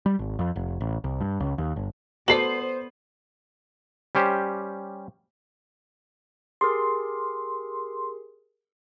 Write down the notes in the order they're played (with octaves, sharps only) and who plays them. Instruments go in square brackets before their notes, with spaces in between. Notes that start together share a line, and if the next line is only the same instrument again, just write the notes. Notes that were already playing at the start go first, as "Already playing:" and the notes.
[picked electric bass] G3
G#1
F2
F1
A1
C2
G2
C#2
D#2
G1
[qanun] B3 [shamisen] F#4 A4 D5 [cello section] C5 [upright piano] C7 F#7
[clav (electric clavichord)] G3 C#4 G4 C5
[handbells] G4 G#4 A#4 [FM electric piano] C6